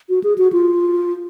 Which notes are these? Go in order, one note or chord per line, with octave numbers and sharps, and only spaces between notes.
F#4
G#4
F#4
F4